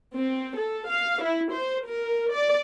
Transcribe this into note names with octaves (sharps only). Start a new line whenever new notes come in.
C4
A4
F5
E4
C5
A#4
D5